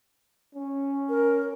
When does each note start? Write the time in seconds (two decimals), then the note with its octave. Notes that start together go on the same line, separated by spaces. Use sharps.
0.55 C#4
1.09 A#4